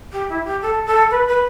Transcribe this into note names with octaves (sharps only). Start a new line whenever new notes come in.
G4
E4
G4
A4
A4
B4
B4